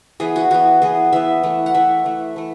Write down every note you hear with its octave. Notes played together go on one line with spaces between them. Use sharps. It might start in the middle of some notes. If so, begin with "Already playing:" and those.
E3 B3 G#4
F#4
E3 B3 F#4
E3 B3 G#4
E3 B3 E5
E3 A3
F#5
E3 A3 E5
E3 A3
E3 A3